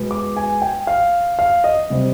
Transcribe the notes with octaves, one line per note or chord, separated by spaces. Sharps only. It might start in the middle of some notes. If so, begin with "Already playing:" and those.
Already playing: B2 G#3 B3
D6
G#5
G5
F5
F5
D#5
C3 G3 C4